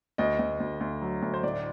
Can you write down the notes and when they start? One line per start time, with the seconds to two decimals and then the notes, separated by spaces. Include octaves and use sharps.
0.18 D2 D#5
0.39 D2
0.60 D2
0.80 D2
1.02 F#3
1.22 D2
1.34 C5
1.43 A2 D5